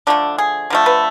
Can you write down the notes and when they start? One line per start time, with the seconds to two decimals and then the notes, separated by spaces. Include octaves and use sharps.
0.07 D3 F3 A3 D4
0.38 G#4
0.70 D3 F3 A3
0.86 B4